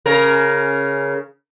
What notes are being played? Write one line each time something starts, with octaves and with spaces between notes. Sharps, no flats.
C#3 A#4